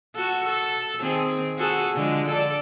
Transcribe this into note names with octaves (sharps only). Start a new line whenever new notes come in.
F#4 A4
A4
D#3 C4 G#4
F#4 G#4 A4
D3 F3 G#3
A4 D5